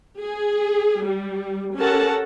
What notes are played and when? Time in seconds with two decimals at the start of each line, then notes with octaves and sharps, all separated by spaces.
0.20 G#4
1.05 G3
1.77 C#4 G4 A4 A#4 F#5 A5